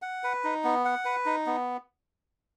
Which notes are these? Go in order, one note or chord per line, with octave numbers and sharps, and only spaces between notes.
F#5
B4
D#4
B3
F#5
B4
D#4
B3